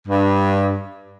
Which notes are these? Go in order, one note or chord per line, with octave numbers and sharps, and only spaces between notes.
G2